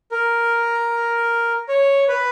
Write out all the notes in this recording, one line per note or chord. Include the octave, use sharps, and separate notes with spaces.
A#4
C#5
B4